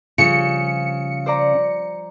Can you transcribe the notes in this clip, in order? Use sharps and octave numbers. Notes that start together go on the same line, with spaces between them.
C#3 F3 G3 F4 C#7
C5 D5 A#5